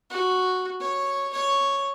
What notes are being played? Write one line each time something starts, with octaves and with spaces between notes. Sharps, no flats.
F#4
C#5
C#5